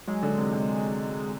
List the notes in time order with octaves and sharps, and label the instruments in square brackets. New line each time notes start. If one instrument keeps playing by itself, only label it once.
[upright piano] F#3 [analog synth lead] G#3
[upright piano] D3
C3
C3